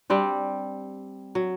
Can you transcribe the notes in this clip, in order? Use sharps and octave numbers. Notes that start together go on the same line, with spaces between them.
G3 C4 D4
F#3